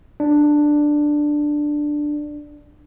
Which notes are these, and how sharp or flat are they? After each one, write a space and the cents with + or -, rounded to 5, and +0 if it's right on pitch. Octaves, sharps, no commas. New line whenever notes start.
D4 +10